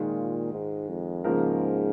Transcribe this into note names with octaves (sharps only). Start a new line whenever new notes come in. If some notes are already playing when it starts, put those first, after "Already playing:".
Already playing: A#2 D#3 G#3 F4
G#2
F2
G#2 C#3 F3 A#3 F4 A#4